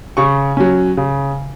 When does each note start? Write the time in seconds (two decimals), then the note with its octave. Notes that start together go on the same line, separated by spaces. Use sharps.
0.17 C#3 C#6
0.57 F#3 C#4
0.97 C#3